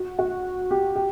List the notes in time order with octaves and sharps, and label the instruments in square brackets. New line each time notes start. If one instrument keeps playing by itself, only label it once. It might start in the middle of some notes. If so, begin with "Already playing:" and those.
Already playing: [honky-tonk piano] F#4
F#4
G4
G4